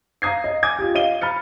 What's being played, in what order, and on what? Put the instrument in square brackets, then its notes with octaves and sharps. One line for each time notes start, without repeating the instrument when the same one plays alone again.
[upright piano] F5 A#5 D#6 G#6 C7
D#5
G#5 D6 D#6 G#6
F4 G4
D#5 F5 D#7 G7
B5 F6 A6 C#7